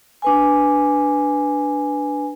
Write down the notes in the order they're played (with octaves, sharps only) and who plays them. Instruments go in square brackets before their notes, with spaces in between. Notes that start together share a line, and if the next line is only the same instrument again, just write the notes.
[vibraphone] D4 B4 G#5